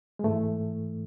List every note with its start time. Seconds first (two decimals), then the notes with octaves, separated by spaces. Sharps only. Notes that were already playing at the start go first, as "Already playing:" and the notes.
0.19 G#3
0.23 G#2 E3 A3